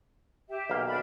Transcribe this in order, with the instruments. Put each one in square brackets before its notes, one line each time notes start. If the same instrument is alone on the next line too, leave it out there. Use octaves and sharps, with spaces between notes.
[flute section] G4 E5
[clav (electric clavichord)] B1 A#3 F5
[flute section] D4 B5